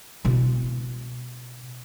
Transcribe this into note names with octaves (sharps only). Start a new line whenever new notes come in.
B2 E4